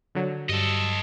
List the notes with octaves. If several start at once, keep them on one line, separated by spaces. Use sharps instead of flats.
D3 F#3
G2 A4 D#5